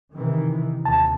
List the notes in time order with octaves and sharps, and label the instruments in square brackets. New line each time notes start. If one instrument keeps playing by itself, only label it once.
[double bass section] C3 D#3 E3
[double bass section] D#2 C3 [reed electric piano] A5